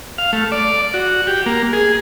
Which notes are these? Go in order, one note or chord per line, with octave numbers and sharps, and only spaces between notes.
F5
A3
D5
F#4
G4
A#3
G#4